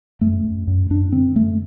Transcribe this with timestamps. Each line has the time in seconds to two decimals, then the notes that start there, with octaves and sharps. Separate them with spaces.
0.21 F#2 A3
0.44 F#2
0.67 F#2
0.90 F#2 D4
1.12 D3 C4
1.35 F#2 A3